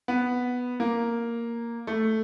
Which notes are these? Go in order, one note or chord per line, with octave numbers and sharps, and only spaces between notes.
B3
A#3
A3